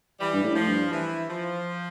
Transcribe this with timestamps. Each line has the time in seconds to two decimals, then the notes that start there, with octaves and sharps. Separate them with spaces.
0.19 E3 G3
0.33 G2
0.43 A2
0.55 F3
0.67 G2
0.92 E3
1.28 F3